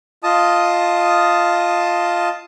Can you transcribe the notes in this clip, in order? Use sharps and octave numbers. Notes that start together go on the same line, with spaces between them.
F4 D#5 A5 D#6